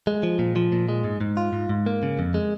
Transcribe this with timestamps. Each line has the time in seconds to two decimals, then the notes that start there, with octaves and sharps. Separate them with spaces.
0.07 G#3
0.23 F3
0.39 A#2
0.56 F3
0.72 A#2
0.89 G#3
1.04 G#2
1.21 G#2
1.37 F4
1.53 G#2
1.69 G#2
1.86 A#3
2.03 C#3
2.19 F2
2.34 G#3